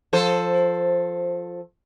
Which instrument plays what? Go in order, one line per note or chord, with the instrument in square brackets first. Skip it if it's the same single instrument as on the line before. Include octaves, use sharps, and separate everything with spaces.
[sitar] F3 A4 C5